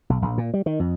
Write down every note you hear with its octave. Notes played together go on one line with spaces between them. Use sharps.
B1
A#1
A#2
G3
D#3
F2